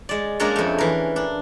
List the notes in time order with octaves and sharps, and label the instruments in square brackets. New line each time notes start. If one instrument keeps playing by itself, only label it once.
[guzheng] G#3 D5
G#3 A#3 C#4 D4 A#4 D5
F2 A3
E3 A#4
D4